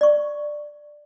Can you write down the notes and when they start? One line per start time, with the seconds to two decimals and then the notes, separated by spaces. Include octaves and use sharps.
0.01 D5 C#6